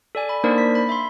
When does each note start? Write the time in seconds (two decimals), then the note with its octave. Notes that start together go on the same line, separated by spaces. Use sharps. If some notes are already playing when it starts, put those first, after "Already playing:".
0.15 A4 D5 G#5
0.29 B5
0.44 A#3 D4 D#4 A#4 C5 D5
0.58 B6
0.75 B5
0.89 E5 B5 C6